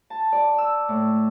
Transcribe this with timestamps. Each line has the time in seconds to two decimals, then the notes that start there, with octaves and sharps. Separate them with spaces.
0.10 A5
0.32 D5
0.58 E6
0.89 A2